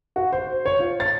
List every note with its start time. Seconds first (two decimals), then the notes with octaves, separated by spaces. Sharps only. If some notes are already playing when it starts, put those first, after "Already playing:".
0.16 F#4
0.32 C5
0.66 C#5
0.79 F4
1.00 A6